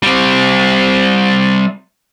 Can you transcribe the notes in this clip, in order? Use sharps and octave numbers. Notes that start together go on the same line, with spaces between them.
G3 C4